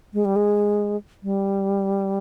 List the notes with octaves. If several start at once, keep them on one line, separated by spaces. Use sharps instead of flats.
G#3
G3
G#3
G3